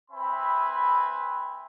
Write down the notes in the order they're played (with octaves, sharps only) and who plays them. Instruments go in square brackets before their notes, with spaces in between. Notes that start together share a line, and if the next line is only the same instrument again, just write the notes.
[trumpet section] C4 B4 E5 G#5 B5